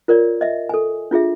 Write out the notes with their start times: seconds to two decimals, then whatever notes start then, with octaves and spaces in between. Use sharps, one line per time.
0.08 F4 A#4 C#5 D5
0.41 D#5 E5
0.69 A4 G#5
1.11 D4 F4 G#4 E5